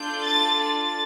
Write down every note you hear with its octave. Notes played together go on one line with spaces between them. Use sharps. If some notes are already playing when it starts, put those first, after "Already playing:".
Already playing: D4 F4 A4 G6
A6
A6